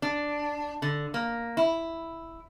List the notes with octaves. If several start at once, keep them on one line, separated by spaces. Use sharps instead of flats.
D4
D3
A#3
E4